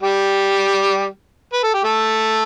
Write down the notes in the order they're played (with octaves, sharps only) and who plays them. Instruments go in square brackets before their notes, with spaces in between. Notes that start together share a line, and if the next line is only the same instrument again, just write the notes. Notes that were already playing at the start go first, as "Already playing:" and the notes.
[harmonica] G3 G4
B4
A4
G4
A3 A4